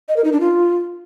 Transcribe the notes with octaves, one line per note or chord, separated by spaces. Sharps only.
D#5
A#4
D#4
D4
F4